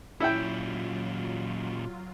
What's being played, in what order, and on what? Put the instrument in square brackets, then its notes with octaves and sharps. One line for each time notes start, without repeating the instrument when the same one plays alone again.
[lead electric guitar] A#2 C#4 [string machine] F#3 F4 [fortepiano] E4 E5 G5